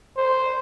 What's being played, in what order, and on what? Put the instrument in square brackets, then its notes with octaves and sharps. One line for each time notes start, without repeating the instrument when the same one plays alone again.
[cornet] C5